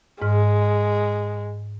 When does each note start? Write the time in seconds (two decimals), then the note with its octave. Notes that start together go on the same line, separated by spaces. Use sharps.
0.22 G#2 G#3 F6